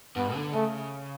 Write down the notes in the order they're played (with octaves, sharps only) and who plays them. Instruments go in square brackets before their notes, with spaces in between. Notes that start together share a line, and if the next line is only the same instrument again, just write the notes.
[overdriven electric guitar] G2 [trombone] B3
[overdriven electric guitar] D3
[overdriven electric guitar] C#3 [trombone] A3